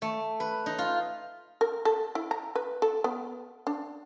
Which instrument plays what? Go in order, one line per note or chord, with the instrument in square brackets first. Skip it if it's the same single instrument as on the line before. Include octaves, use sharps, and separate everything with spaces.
[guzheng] A3
B4
D#4
F4
[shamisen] A#4
A4
E4
A#5
B4
A4
B3
D4